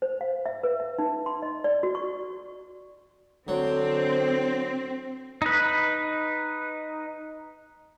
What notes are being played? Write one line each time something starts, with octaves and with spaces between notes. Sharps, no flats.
C5
F5
E5
B4
E5
D#4
C6
D#5
D5
F#4
C#6
D3 F#3 C4
D#4 B4